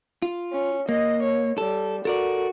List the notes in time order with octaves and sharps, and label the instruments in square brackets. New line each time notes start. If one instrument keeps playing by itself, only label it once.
[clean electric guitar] F4
[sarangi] C#4
[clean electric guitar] A#3 [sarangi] D#5
[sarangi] C#5
[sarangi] G3 [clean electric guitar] A4
[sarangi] F#4 [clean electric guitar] A4 A#4 D5